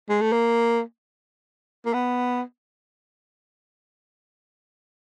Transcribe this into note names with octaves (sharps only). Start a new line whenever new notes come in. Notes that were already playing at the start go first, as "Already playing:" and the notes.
G#3
A3
A#3
A#3
B3